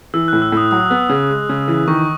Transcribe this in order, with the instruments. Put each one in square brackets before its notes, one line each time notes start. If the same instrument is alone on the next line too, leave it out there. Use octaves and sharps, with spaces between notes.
[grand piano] E3 [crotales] E6
[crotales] F#6
[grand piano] A2
[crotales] E6
[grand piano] A2 [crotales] D#6
[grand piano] F#3 [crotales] D#6
[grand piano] B3
C#3
G#3
C#3
E3
[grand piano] D#3 [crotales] C#6